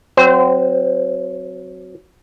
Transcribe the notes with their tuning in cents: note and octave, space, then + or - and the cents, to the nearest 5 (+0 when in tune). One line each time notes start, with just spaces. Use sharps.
F#3 +0 C4 +0 C5 -30